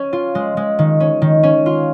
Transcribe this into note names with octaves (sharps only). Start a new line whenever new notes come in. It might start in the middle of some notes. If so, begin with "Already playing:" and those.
Already playing: C#4
F4
G#3
G#3
D#3
C#4
D#3
C#4
F4